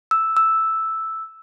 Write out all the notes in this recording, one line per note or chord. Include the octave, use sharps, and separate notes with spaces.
E6
E6